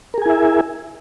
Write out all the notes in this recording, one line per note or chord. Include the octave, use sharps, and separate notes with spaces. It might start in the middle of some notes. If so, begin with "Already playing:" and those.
E4 G#4 A#4 E5 G#5